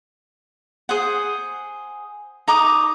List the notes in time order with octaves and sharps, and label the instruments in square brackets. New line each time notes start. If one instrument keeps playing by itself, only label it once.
[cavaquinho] G#4 C5 F#5
D#4 A#5 D6 D#6